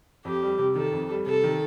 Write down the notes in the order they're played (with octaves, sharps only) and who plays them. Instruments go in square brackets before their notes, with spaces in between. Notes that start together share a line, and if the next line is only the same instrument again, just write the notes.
[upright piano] F2 [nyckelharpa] G4
[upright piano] G3
C3
[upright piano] D#3 [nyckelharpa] A4
[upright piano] F2
G3
[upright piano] C3 [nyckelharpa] A4
[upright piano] D#3